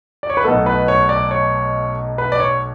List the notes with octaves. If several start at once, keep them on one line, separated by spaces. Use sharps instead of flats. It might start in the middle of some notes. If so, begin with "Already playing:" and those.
D5
C#5
B4
B1 B2 A3 A4
B4
C#5
D5
C#5
B4
D5
C#5